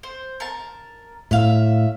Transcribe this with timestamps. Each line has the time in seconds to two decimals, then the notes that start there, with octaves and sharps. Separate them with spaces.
0.03 C5
0.40 A#4 A5
1.31 A2 E5 F5